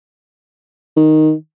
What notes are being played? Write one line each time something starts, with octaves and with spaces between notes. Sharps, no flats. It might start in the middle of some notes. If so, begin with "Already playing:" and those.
D#3